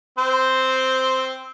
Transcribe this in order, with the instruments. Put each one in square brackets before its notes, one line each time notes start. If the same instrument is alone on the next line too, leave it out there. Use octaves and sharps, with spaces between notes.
[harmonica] C4 C5